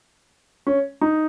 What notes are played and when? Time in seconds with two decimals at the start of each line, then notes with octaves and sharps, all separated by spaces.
0.67 C#4
1.01 D#4